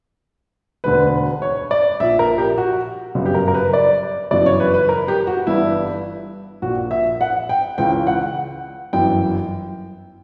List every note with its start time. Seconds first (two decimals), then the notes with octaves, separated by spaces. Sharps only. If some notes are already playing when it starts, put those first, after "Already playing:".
0.84 E1 D2 D3 B4
1.42 C#5
1.71 D5
2.00 A#1 A#2 E5
2.19 A#4
2.38 G4
2.58 F#4
3.15 G1 F#2 C#3
3.26 G4
3.34 A#4
3.48 A#4
3.54 B4
3.73 D5
4.31 G1 F#2 C#3 E3 D5
4.46 C#5
4.60 B4
4.74 B4
4.89 A#4
5.08 G4
5.27 F#4
5.47 G1 G2 E3 E4
6.62 A#1 F#4
6.67 A#2
6.91 E5
7.21 F#5
7.49 G5
7.78 C#2 C#3 E3 G5
8.07 F#5
8.93 G1 F#2 E3 G5